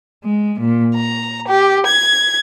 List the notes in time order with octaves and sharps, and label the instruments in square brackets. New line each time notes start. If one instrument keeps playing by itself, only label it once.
[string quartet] G#3
A#2
A#5
G4
G#6